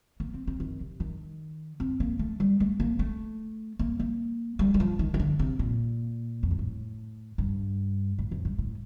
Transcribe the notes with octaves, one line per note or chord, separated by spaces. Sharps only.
A#3
C4
C4
D#3
C3
D#3
C4
A#3
A3
G3
A3
A#3
A3
A#3
A#3
G3
G3
F3
D#3
D#3
D3
C3
A#2
F2
G2
A2
G2
A2
F2
G2
A2